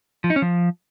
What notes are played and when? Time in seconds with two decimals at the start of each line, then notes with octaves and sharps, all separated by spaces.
0.24 F3
0.30 D#4
0.36 C#4
0.42 F3